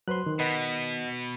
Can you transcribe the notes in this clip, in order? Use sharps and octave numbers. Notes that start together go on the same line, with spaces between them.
F#3 B4 C5 C6 F#6
D#3
B2 B4 D#5 F#5